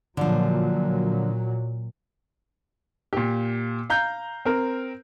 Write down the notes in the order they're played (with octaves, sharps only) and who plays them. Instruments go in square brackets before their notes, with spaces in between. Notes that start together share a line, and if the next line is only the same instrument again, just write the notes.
[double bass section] A#2 F#3 [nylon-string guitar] D3 F3
[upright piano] A#2 G4
F5 A#5 G6
C4 A#4